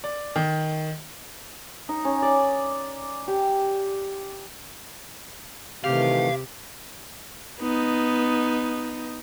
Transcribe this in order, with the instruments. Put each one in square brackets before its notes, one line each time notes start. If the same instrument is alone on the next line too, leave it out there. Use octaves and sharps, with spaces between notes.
[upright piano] D5
D#3
[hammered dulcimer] D#4
C#4
D5
G4
[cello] C3 [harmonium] D#3 E3 A3 [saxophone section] G4 [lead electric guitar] F5
[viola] B3 D#4